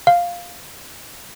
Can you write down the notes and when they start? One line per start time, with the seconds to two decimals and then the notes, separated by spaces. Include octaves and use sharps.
0.07 F5